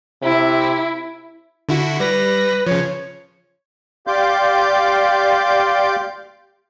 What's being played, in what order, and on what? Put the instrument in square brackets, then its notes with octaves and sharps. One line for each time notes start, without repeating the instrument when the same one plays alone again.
[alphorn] C3 [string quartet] E4
[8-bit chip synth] D3 E4 F#4
[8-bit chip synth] G3 A#6 [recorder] B4
[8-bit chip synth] C#3 F3 [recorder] C#5
[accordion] G4 D5 F5 C6 D6 G6